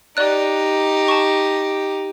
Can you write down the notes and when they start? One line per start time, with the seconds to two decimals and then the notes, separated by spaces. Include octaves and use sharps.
0.17 D#4 G4 D5 F#6
1.08 A5 C#6